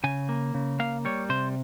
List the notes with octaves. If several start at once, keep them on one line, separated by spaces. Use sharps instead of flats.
C#3 G#5
A#3
C#3
A#3 F5
G3 C#5
C3 C5